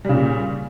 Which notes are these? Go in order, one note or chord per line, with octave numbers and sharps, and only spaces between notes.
A#2 C#3 G3